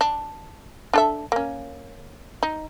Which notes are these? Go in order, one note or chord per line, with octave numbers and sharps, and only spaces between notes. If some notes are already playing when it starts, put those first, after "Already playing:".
D4
D4 A4 E5
A#3 C#4
D#4